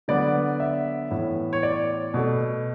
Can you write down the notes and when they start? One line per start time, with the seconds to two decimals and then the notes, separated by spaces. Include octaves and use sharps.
0.08 D3 F#3 B3 D5
0.60 E5
1.11 A2 E3 B3
1.53 C#5
1.63 D5
2.14 B2 A3